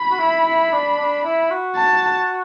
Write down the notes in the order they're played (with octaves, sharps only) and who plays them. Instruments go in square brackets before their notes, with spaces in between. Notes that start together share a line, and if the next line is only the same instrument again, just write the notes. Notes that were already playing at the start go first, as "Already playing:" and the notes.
Already playing: [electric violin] B5
[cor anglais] F#4
E4
E4
D4
D4
E4
F#4
[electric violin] A5